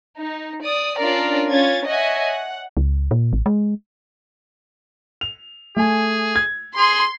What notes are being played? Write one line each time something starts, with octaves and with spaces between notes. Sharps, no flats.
D#4
D5 D#6
C#4 D4 F4 A#4 D5
C#4 F4 G#6 A6
C#5 D#5 E5 F#5 G#5
F#5
C#2
A#2
A1
G#3
F7
A3 G#4 G#5
G#6
G#4 C6